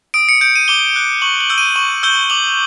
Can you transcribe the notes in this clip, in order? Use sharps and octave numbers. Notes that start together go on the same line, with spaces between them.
D#6 D7
C#7
G6 D7
D#7
D6 G7
F#6
C#6 F#7
F#7
E6 G6
D#7
C#6 F#7
E6 G6 G7
D6 F#7